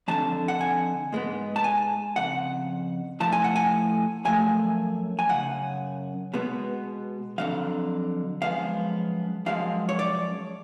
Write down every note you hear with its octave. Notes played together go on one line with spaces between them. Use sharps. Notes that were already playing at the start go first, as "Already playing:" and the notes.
F2 D3 F#3 A5
F#5
G#5
G#2 G#3 B3
A5
G#5
F2 C#3 F#5
A2 F3 A3 A5
G#5
F#5
G#5
F#2 F3 A3 G#5
G#5
F#2 C#3 F#5
B2 G#3 B3
F2 D3 F#3 F5
F#2 F3 G#3 B3 F5
F#2 F3 G#3 F5
C#5
D5